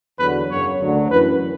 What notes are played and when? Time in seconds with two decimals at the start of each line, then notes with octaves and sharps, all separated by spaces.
0.19 E2 D3 F#3 B4
0.49 F#2 C#3 F#3 C#5
0.80 D2 D3 F#3
1.10 F#2 E3 B4